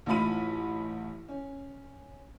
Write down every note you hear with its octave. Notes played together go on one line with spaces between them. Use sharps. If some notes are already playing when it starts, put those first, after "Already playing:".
A1 A2 D#4 F4 B5 D#7
C#4